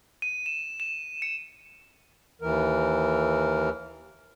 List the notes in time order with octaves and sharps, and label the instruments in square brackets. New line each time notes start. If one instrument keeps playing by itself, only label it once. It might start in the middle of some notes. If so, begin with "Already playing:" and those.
[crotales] D#7
E7
E7
C#7
[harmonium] D#2 E3 A#4